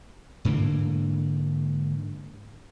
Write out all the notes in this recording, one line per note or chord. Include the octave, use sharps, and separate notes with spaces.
G#2 D3 E3 A#3